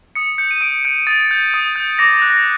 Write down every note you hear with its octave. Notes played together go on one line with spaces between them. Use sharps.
D#6 C#7
G6 C#7
D#7
D#6 D7
G6 D7
D#6 A6
G6
D#6
G6
D6 A#6
A#6
F#6
A#6